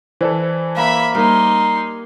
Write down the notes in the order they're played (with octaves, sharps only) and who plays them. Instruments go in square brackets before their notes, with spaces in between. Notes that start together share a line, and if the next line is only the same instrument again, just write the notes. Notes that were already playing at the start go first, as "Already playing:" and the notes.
[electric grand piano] E3 E4 A4 [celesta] C5 D5
[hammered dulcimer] A#3 [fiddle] E5 B5
[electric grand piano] G3 A#3 [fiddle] D#4 C6 [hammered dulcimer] A#4